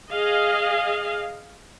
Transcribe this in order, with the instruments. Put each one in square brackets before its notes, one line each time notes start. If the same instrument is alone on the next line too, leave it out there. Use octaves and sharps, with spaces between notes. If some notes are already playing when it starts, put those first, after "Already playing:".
[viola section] G#4 D#5 F5